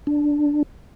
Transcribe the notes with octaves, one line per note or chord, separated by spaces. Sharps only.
D4